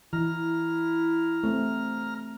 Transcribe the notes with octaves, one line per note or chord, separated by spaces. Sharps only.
E3 E4 A#5 F6
A3 C4